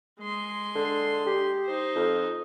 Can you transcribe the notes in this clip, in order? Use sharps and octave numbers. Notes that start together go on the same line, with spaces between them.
G#3 C6
D3
G4
D#4 C5
F2